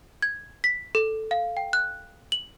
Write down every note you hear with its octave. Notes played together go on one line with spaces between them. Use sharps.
G#6
B6
A4
F5
G5
F#6
F#7